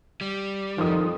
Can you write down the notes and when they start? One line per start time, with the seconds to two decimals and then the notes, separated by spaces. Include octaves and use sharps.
0.21 G3
0.78 F2 D#3 F3 D#6